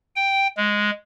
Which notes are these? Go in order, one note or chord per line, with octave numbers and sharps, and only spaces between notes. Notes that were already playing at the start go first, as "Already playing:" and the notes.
G5
G#3